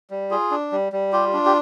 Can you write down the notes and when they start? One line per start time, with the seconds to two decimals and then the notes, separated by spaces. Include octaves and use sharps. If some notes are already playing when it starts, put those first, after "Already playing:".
0.11 G3
0.31 F4 G#4
0.51 D4
0.72 G3
0.92 G3
1.13 F4 G4
1.33 D4
1.46 G4